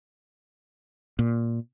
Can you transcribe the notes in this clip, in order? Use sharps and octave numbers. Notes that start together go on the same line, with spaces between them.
A#2